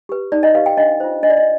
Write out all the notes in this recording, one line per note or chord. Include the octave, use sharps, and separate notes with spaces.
G4 B4
D#4 D5
D#5
G4 B4 F5
G5
D4 D#5
F4 C5
D4 D#5
D5
D#5